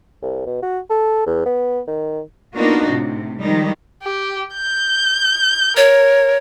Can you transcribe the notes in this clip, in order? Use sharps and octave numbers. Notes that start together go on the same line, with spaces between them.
C2
B2
F#4
A4
E2
B3
D#3
A#3 B3 D4 D#4 F4 F#4
A2 C3
D#3 F3 G3 G#3 D#4
G4
G6
A#4 C#5